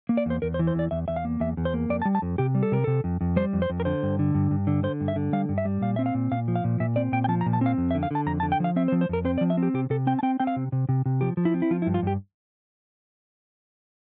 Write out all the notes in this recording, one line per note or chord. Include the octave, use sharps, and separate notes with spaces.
A#3
D5
E2 C5
E2 A#4
C5
E3
C5
E2 D5
E2 E5
E2 E5
F5
A#3
E2 E5
E2
C5
A#3
F2 D5
A5
G3
A5
F2
C3 G4
G3
A4
C3 A#4
C3 A4
F2
F2
G3 C5
F2
C5
F2
A#4
D3 C5
G2
D3
G2
G2
D3
D3 C5
G2
E5
D3
G3 F5
G2
E5
G3
A#2 F5
C4 E5
F5
A#2
A#2 F5
F3
F5
A#2
A#2 E5
C4 D5
A#2 G5
G5
F3 A5
A#5
A#2
A5
C4 F5
F2
E5
D3
F5
D3 A5
F2 A#5
A5
D3
G5
F3 F5
C4 E5
C5
F3
C5
F2 A#4
C4 C5
D5
F3
E5
C4
G4
C3 G4
C3 A4
C4 G5
A5
C4 G5
C4 G5
F5
C3
C3
C3
C3
F3 G4
F3
E4
C4
E4
F3 F4
E4
G2
F4
G2 G4